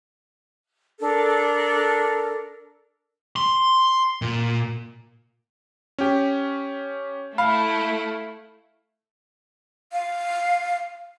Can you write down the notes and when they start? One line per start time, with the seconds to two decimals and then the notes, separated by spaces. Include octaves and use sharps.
1.01 D4 A4 A#4
3.36 C6
4.22 A#2
5.98 C#4 G4
7.38 A3 E4 F5 B5
9.92 F5